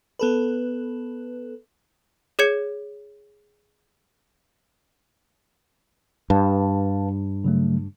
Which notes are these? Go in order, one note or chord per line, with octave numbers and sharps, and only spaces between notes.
B3 A4 B4
G#4 C#5 G#6 C#7
G2 B4 F5 A5
C#3 F#3 A3